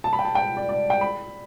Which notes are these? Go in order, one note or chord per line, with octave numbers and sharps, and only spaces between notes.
A5
B5
G5
A5
G5
D5
D5
G5
B5